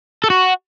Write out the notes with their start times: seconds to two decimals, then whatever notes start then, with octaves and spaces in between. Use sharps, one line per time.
0.24 A4
0.30 F#4